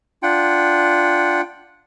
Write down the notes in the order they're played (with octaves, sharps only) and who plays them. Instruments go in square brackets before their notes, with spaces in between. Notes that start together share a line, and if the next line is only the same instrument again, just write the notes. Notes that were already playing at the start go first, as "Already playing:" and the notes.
[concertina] D4 F4 F#5 G5